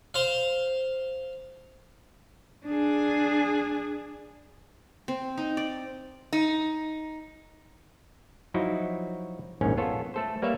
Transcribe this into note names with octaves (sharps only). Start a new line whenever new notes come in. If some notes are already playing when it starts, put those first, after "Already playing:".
C5 F5
D4 G#4
C4
D#4
D5
D#4
F3 F#3 D#4 E4 F#4
A#1 E2 G#2 D#3 C#4
B3 F4 A4 C#5
A3 A4 C5
G3 A#3 B4 C#5 E5 F5